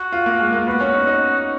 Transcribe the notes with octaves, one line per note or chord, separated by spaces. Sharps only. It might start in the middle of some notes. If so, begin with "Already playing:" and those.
Already playing: F#4
F4
A#3
G#3
A#3
B3 F#4
C#4
D#4
D#4